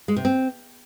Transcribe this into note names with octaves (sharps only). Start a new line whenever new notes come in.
G#3
C3
C4